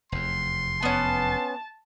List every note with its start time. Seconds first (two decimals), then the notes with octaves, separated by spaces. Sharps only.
0.12 F1 E2 C6
0.82 B3 C#4 A5